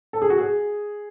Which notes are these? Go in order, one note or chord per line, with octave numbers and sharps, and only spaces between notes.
A4
G#4
F#4
G#4